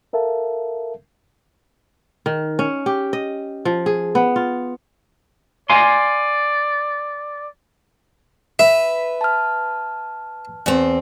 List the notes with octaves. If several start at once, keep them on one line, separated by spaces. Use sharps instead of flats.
A4 A#4 E5 F5 A5
D#3
C#4
G4
D#5
F3
G#4
B3
F4
D5 F5 G#5 C6
B4 E5
A5 F6
E2 C4